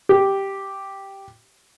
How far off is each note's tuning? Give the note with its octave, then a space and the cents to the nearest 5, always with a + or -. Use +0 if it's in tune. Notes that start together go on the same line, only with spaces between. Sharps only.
G4 -5